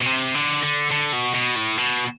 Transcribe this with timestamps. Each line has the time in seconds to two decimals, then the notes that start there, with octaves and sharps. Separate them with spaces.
0.01 B2
0.06 C3
0.35 D3
0.63 D3
0.91 D3
1.13 B2
1.35 B2
1.56 A2
1.77 B2